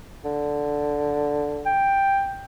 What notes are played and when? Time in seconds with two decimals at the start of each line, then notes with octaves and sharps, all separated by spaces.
0.24 D3
1.66 G5